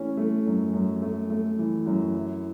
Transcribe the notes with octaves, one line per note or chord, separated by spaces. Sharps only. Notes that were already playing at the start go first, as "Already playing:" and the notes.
Already playing: E3 A3 C#4
A3
F#2
F#2
A3
A3
E3
F#2
E4